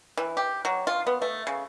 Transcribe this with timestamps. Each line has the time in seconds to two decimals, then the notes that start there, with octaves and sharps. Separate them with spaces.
0.18 E3
0.37 G4
0.65 F#3
0.87 F4
1.07 B3
1.22 A3
1.47 C#3